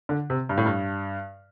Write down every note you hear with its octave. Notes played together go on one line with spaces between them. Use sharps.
D3
C3
G2
A2
G2